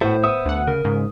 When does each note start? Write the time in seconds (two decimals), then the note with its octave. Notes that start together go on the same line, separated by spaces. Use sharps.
0.01 A2 A3 B3 F#4 C5
0.24 B3 E5 D#6
0.45 D2 F#5
0.67 C#3 A#4
0.85 G#2 C#3